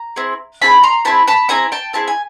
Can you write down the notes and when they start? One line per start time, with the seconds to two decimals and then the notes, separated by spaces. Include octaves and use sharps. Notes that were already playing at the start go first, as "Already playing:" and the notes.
Already playing: A#5
0.16 C4 E4 G#4
0.62 C4 E4 G#4 A5 B5
0.83 A#5 C6
1.05 C4 E4 G#4 A5 B5
1.27 A5 B5
1.49 C4 E4 G#4 G#5 A#5
1.72 G5 A5
1.93 C4 E4 G#4 A5
2.08 G#5